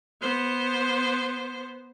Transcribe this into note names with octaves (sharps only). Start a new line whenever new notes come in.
B3 C5